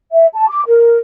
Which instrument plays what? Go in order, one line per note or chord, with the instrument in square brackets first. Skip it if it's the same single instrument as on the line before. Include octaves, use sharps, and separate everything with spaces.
[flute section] E5
A5
D6
A#4